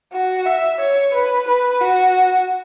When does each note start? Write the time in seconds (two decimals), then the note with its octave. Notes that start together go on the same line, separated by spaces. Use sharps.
0.12 F#4
0.46 E5
0.80 C#5
1.13 B4
1.47 B4
1.80 F#4